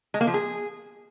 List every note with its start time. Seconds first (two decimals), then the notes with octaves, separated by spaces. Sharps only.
0.14 G#3
0.21 A#3
0.27 F3
0.34 G#4